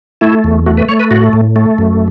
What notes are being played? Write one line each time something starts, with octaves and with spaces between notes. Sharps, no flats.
A3 E4
E2
A3 F#4
B4
A3 C#5
B4
A2 F#4
A2
A3
F#2